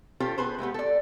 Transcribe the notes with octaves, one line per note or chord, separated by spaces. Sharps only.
C#4 F4 G4 A4 C5
B3 G#4 B4 C5
G#3 A3 B3 G4
A4 D5